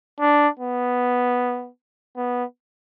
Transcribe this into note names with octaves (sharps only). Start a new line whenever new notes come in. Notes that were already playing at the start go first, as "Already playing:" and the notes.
D4
B3
B3